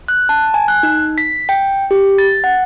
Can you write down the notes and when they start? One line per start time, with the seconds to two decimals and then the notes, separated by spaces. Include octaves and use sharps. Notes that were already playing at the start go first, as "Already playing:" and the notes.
0.08 F#6
0.29 A5
0.54 G#5
0.68 F#6
0.83 D#4
1.18 B6
1.49 G5
1.91 G4
2.18 A6
2.44 F#5